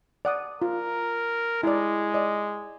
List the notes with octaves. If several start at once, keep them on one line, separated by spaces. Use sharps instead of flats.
D5 F#5 D#6
F4 A#4
G#3 E4 D5
D5 D#5